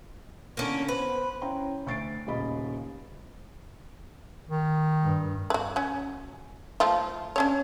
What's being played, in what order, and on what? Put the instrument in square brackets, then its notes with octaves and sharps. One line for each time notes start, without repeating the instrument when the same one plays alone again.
[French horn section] A2 D3 [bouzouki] A#3 C#4
[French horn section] B3 C5 [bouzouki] B4
[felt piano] C#4 E4 C5 G5 A#5 C6
D2 C#6 A6 C7 D7
D#1 C#3 D#5 B5
[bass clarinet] D#3
[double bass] G2
[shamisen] F#4 B4
F#3 C#4
F3 A3 F4
C#4 D4 C#5